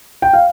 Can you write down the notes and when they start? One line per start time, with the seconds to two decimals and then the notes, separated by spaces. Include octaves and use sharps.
0.22 G5
0.33 F5